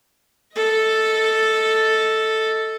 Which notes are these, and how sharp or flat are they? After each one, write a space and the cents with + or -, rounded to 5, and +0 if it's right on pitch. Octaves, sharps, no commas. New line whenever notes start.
A4 +0 D#5 +25